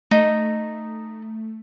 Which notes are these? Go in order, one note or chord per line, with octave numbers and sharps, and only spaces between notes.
A3 D#4